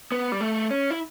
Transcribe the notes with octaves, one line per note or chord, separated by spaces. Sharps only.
B3
G3
A3
C#4
E4